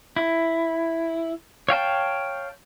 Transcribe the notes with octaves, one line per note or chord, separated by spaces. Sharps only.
E4
C#5 F5 G5 A5